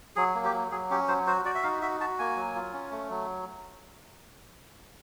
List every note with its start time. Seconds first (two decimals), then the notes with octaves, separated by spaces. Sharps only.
0.16 F#3 G#4
0.35 A#3
0.44 G4
0.53 F#3
0.71 F#3 G#4
0.90 C#4 G4
1.08 F#3 C5
1.27 F#4 C5
1.45 F#4 D5
1.55 E5
1.63 D#4 F5
1.82 F#4 E5
2.00 F#4 A5
2.19 A#3 G#5
2.37 F#3
2.55 F4
2.73 C#4
2.91 A3
3.10 F#3